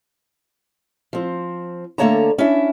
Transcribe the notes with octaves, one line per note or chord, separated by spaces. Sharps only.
F3 C4
D3 A3 A#3 C#5 A5 A#5
C#4 D4 E4 E5